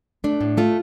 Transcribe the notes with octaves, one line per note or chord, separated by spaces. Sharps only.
A3 D4
A2
A3 F4